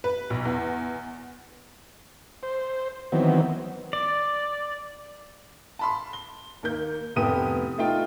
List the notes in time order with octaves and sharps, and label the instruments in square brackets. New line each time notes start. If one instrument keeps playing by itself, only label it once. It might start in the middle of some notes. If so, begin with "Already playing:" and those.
[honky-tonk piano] B4
B1
E2
[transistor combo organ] C5
D#3 E3 F#3 B3 C4
[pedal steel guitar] D5
[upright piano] A5 B5 C6
G7
D#2 A#3 G6
F1 A2 B3 G4 D#6 D#7
A3 D#4 F4 G5